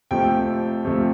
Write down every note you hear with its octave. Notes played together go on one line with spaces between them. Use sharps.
F2 C3 F3 A3 G5
F2 C3 F3 A3